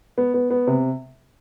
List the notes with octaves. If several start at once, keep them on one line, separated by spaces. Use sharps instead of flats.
B3
B3
B3
C3